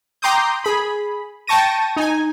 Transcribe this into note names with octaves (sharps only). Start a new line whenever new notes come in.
G5 A#5 C6 D6 D#6 G6
G#4 B5
G5 A5 C#6 A#6 D#7
D#4 G#5